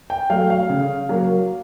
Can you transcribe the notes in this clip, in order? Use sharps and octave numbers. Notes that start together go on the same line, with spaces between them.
G5
F#3 A3 F5
F5
C#3
F#3 A#3